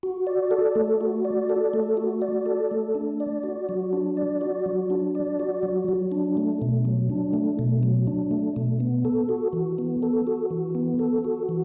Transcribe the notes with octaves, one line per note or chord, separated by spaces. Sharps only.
F#4
D5
A4
A3
F#4
D5
A4
A3
F#4
D5
A4
A3
D4
D5
F#4
F#3
D4
D5
F#4
F#3
D4
D5
F#4
F#3
F#3
D4
A3
B2
F#3
D4
A3
B2
F#3
D4
A3
B2
B3
A4
F#4
E3
B3
A4
F#4
E3
B3
A4
F#4
E3